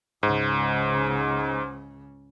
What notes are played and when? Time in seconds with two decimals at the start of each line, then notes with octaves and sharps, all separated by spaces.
0.23 C#2 G#2 C#3